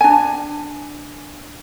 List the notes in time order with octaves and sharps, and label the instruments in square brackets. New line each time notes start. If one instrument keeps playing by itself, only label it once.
[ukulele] D4 G#5